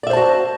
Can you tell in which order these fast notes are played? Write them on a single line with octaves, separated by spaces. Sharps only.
D5 E5 C5 A5 F#4